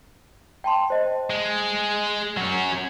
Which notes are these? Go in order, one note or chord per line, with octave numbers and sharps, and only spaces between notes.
G5 A5 C6
C5 D#5
G#3
F#3 C#4 F#5